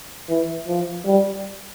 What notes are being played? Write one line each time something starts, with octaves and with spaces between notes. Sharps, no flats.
E3
F3
G3